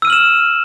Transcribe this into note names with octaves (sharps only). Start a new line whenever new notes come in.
E6 F6 D#7 E7 F#7